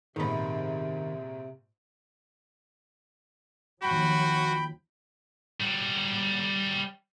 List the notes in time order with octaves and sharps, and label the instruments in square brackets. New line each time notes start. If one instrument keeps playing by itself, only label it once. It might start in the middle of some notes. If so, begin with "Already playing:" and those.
[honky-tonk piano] A#1 G#2 [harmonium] C3 [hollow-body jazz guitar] D#3 B3
[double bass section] D#2 F3 F#3 [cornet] F#4 [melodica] G5 B5
[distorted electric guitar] G3 F#4